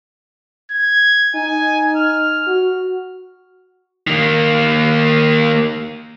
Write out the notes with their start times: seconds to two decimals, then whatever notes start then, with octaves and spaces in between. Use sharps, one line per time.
0.71 G#6
1.35 D#4 G#5
1.96 F6
2.47 F#4
4.07 D#3 A#3